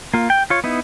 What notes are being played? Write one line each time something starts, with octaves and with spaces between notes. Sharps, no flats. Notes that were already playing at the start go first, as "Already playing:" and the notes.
A#3 F4
G5
F4 C#5
B3 D#4 E4